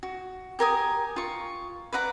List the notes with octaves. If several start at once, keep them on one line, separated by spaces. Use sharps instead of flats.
F#4
G4 A#4 G#5 D#6
F4 C#6
B4 D5 F#5 A#5